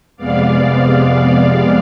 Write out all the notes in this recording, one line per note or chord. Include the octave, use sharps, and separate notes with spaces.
F2 C3 G#3 B3 D5 F5